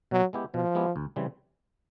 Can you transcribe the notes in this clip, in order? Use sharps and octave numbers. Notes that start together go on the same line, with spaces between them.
B2 F#3
G#3 B3 E4 G4
B2 F3
G#3 B3 E4 G4
D2
C#3 E3 G3 C4